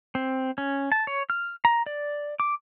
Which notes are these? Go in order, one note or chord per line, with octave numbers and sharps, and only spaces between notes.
C4
C#4
A5
C#5
F6
A#5
D5
D6